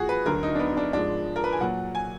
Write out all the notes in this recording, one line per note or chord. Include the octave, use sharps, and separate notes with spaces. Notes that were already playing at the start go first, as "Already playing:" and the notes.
Already playing: A#2 F3 F#4 G#4
B4
D2 D3 F#3 A#4
D#4
D4
B3
D4
G#2 F3 G#3 D4
A#4
B4
G#5
A#2 F#3 F#5
G#5